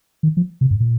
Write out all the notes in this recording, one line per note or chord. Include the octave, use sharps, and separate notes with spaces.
D#3
F3
C3
G2
A#2